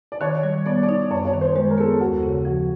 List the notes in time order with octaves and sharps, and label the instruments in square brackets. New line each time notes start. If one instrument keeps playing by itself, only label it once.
[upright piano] D5
[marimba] D#3 [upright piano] C#5
[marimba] G3
[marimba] B3 [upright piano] D5
[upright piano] D5
[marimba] D#4
[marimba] F#2 [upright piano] C#5
[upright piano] C#5
[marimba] D#3
[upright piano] C5
[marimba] G#3 [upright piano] C5
[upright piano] A#4
[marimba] B3 [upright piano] A4
[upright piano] G#4
[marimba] D#2 [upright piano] F#4
[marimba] C#3
[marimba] F3 [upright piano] F#4